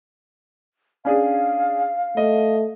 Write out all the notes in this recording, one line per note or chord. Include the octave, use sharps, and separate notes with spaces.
C#4 D4 G#4 F5
A3 D#5